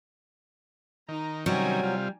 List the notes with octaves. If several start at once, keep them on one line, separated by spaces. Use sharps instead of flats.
D#3 D#4 A#5
C3 D#3 F#3 G3 C#4 G#5 A#5
C3 F4